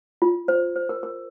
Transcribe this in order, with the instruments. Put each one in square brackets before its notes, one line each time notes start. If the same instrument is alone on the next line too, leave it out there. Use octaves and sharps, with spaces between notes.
[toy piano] F4
C5
C5
A#4
A#4